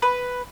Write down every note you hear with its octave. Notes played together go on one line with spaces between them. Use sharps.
B4